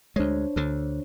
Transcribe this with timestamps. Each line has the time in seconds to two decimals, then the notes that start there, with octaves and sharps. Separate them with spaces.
0.16 D2 G#3 D4 C5 C#5
0.56 D2 D3